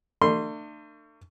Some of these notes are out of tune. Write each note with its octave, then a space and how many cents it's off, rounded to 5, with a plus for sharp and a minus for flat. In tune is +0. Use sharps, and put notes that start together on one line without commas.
A3 +40 D4 +40 C6 +0